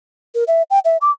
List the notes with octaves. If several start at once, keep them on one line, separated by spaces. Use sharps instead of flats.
A#4
E5
G5
E5
D6